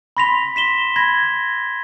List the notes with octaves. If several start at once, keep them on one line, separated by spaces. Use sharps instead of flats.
B5 C6 A#6 B6 F7
B6 E7 G7
B5 G#6 A#6